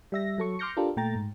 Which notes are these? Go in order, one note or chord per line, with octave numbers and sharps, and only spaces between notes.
G3 E5 A#6
F#3 A4 C#6
C6 D6 F6 G6 A#6 C#7
D4 F4 G4 A4 A#4
A#2 A3 G5 A#5 A6
G#2